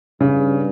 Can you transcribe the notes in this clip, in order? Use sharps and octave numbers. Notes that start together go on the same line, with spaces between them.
G2 C#3